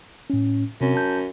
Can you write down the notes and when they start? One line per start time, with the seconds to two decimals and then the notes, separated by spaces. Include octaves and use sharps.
0.30 A2 C#4
0.81 F#2 C3 C4
0.95 A5 G6